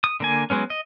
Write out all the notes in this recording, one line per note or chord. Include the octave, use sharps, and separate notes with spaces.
D#6
D3 A#3 G#5
F#3 G#3 B3 C#4
D#5